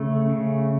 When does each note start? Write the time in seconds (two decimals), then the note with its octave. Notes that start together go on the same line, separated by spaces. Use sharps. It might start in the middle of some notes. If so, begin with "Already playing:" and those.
Already playing: C#3 A3
0.29 C#3